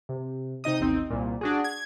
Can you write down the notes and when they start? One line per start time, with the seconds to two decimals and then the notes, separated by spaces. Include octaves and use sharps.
0.09 C3
0.64 C3 D#4 D#5 D#6
0.80 A1 D#2 C4 D#4
1.10 C2 A#2
1.41 D4 F#4 G#4
1.64 G#6